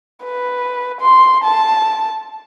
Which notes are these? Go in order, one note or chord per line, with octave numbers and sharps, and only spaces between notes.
B4
C6
A5